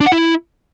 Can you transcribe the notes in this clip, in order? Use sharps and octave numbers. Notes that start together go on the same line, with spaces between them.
D4
F#5
E4